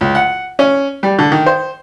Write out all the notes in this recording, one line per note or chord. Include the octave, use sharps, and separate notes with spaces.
C#2
F#5
C#4
G3
D3
D#3
C5